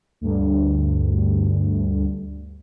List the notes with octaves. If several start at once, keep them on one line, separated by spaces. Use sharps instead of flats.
D2 G2